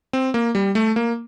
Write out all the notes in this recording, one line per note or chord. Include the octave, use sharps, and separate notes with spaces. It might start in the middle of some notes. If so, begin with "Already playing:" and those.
C4
A#3
G3
A3
A#3